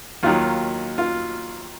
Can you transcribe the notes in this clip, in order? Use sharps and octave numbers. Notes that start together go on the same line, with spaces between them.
D#2 D#3 F#3 F4
F4